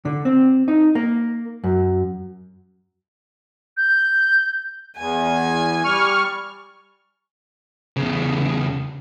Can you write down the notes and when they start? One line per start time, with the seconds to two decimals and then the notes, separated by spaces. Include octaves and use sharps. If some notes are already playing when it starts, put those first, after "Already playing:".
0.05 D3
0.25 C4
0.68 D#4
0.95 A#3
1.64 F#2
3.77 G6
4.97 E2 G#5
5.84 G3 C#6 F6
7.96 E2 C#3